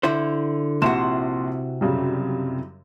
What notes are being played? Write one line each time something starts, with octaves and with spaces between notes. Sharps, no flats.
D3 E4 C5
A#1 C3 E4 F#4 C6 E7
F#2 C#3 G3